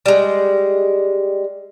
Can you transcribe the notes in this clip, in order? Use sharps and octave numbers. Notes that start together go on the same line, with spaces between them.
G3 G#3